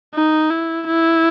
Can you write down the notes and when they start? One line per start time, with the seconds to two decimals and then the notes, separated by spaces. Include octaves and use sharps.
0.14 D#4
0.50 E4
0.87 E4